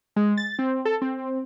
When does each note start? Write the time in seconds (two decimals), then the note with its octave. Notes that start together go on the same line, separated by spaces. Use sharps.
0.16 G#3
0.37 A6
0.59 C4
0.85 A4
1.02 C4